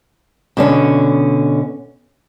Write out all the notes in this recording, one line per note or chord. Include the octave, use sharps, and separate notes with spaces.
B2 D3 C#4